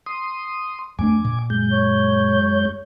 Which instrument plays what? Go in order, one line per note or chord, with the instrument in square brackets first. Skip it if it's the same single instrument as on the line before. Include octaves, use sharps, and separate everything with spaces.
[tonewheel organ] C6 D#6
[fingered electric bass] F2 A3 D4 [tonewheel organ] G#5 D6
[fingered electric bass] A#2
[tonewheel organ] F#2 G#3 G6
[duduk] C#5